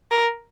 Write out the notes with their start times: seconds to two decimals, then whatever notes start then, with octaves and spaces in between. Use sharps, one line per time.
0.11 A#4